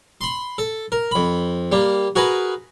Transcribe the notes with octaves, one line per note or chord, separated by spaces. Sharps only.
B5 C6
A4
A#4
F2 B5
G3 A#3
F#4 G#4 A#4 B4